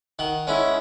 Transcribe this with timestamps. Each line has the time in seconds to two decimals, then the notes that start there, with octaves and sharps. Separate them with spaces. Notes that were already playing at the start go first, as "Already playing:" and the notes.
0.19 D#3 F#5
0.47 G#3 C#4 E4